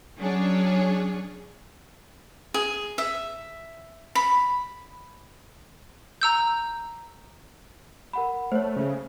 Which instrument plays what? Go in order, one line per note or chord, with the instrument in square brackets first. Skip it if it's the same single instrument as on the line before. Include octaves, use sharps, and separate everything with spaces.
[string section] F#3 C#4 D4 G#4 C#5
[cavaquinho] G#4
E5
B5
[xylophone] A#5 E6 G6
[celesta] A#4 F#5 B5
[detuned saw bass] A3 [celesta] C5 C#5
[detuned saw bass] C#3